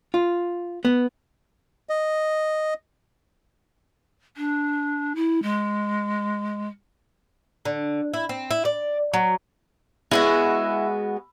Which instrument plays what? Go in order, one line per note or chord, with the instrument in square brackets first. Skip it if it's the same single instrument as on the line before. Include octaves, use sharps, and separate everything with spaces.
[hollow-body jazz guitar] F4
B3
[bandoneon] D#5
[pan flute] D4
E4
G#3
[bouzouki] D3
E4
C4
E4
D5
F#3
[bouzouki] G#3 B3 F#4 [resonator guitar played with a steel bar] E4